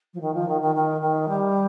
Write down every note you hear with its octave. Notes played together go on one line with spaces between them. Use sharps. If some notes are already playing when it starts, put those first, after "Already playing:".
F3
D#3
F3
D#3
D#3
D#3
D#3
G3